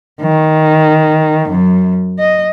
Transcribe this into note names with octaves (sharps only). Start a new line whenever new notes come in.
D#3
F#2
D#5